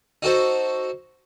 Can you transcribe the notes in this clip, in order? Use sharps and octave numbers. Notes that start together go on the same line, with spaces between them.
D#4 F#4 A4 C5